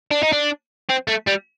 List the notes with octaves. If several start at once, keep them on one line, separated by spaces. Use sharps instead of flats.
D4
D#4
D4
C4
A3
G3